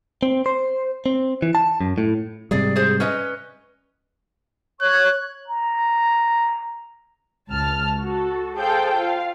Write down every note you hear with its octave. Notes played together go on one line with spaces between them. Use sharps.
C4
C5
C4
E3
A5
F#2
A2
G#2 C3 G3 G#4 D5
G#4 C5
C#4 B4 D#5
C#5 C#6 F#6 G#6
A#5
C#2 A5 F6
F#4 A4
G#4 A4 C5 F5 G5
F4 F5